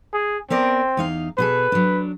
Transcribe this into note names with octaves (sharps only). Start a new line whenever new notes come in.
G#4
B3 C4 A#4 D5
E2 D#4 F5
B2 G#4 A4 B4
F#3 D4